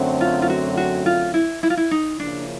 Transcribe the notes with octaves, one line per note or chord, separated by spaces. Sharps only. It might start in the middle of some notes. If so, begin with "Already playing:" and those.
Already playing: F#2 D3 F#3 A3 C4
F4
F4
F#4
F#4
F4
E4
E4
F4
E4
D#4
C#3 F3 A#3 C#4 D4 E4